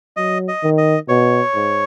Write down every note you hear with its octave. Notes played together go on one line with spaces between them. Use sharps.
F#3 D#5
D#5
D#3
D#5
B2 C#5
G#2